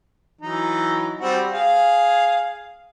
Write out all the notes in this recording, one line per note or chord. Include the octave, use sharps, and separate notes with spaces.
E3 F#3 D#4
G3 C4 F#4
G#4 F5